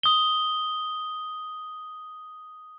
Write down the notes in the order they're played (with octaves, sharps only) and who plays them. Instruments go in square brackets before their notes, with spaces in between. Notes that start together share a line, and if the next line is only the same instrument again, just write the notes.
[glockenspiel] D#6 G7